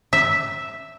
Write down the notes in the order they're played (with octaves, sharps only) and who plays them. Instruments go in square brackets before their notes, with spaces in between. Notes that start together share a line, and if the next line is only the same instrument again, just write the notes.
[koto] E5